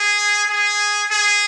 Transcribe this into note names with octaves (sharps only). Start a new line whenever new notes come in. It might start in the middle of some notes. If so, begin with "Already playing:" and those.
Already playing: G#4
G#4
G#4